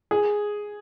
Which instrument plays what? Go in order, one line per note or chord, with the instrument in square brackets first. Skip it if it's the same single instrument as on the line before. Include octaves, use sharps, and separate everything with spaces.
[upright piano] G#4